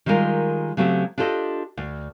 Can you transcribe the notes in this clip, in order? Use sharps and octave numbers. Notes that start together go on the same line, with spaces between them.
D#3 G3 G#3 E4 F4 A#4
C#3 F#3 A3 C4 G4
D4 F4 G4 A4 C5 D#5
D2